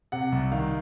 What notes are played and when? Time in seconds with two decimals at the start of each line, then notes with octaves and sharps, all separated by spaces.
0.12 C3 F#5
0.32 C2
0.52 D#3 F5